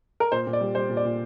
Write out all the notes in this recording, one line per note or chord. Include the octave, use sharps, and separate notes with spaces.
A#4
A#2 C5
A#2
D5
G3
G3 C5
A#2
D5
A#2